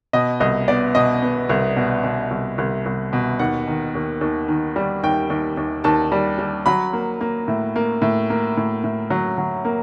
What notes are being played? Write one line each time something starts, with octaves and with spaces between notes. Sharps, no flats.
B2 D#5
C2 D#5
B3 D5
B2 D#5
B3
C2
B2
B2
C2
C2
C2
B2
D#2 F#5
D#3
D#2
D#2
D#3
G3
D#2 G5
D#2
D#2
D#2 A5
G3
G3
F#3 B5
A#3
A#3
A2
A#3
A2
A#3
A2
A2
F#3
F#3
A#3